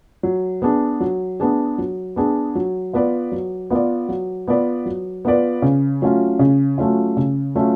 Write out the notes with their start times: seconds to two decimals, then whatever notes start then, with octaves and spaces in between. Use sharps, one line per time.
0.23 F#3
0.62 B3 D4 G#4
1.00 F#3
1.40 B3 D4 G#4
1.78 F#3
2.16 B3 D4 G#4
2.55 F#3
2.93 B3 F4 B4 D5
3.32 F#3
3.70 B3 F4 B4 D5
4.09 F#3
4.48 B3 F4 B4 D5
4.86 F#3
5.25 B3 F4 B4 D5
5.62 C#3
6.02 F#3 A3 C#4 F4
6.39 C#3
6.78 F#3 A3 C#4 F4
7.17 C#3
7.55 F#3 A3 C#4 F4